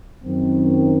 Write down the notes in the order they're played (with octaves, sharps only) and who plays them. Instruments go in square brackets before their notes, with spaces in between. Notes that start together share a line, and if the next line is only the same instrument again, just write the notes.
[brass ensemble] F#2 D#3 C4